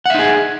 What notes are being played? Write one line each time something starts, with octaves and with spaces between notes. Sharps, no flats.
D#4 G#4 E5 F#5